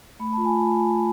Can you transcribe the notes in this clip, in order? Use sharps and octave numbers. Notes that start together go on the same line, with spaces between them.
A3 B5
F4 A5
G#5